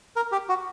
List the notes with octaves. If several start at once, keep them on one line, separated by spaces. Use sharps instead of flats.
A#4
G4
F#4